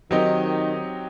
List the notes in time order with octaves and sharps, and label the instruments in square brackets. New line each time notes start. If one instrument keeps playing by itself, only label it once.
[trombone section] D#3 [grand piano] F#3 C4 D#4 G4 D#5